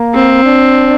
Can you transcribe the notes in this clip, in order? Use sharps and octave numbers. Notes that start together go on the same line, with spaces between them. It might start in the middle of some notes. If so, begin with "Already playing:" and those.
Already playing: A#3
C4
D4